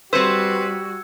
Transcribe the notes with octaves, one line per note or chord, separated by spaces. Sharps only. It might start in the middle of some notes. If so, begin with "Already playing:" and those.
G3 C4 F#4 B4 C5 E6 G#6 C#7